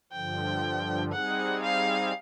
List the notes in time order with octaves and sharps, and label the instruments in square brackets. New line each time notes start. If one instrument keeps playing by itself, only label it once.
[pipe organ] G2 D3 F3 [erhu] G5
[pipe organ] G3 C4 D#4 G#4 [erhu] F#5
[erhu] F5